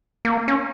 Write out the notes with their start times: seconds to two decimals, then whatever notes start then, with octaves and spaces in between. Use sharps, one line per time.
0.25 A#3
0.48 C#4